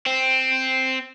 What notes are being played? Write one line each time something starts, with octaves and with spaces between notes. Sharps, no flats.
C4